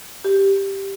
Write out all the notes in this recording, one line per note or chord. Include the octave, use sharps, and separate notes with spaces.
G4